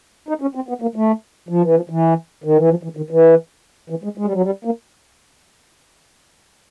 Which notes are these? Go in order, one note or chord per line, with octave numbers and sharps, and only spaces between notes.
D#4
C#4
C4
B3
A#3
A3
F3
E3
F3
E3
D#3
E3
F3
E3
D#3
E3
E3
G#3
G#3
G3
F#3
G3
A#3